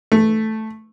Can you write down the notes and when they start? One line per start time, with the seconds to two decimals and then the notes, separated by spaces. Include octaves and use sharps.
0.12 A3